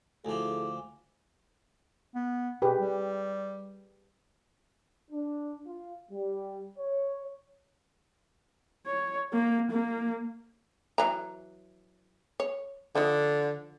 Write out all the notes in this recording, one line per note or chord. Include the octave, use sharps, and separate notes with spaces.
D2 F3 E4 G#4 A4 G#5 D6
B3
B2 G4 G#4 B4
G3
D4
F4
G3
C#5
C#5
A#3
A#3
E3 F#3 A#5
C#5
D3 F3 D#4